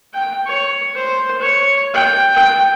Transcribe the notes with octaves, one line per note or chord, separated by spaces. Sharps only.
G5
C#5
C5
C#5
G5
G5